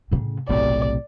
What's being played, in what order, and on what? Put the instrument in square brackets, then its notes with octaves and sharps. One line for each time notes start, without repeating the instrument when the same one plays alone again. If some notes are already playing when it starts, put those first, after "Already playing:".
[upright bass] A2 C#3
[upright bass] F#1 [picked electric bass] B1 A2 C3 [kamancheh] D5